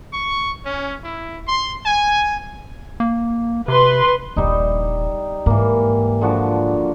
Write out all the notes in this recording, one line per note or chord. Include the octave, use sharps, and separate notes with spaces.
C#6
C#4
E4
C6
G#5
A#3
C3 B4 C6
D#1 A#1 G3 D#4
G#2 E3 A#3
D3 F3 F#4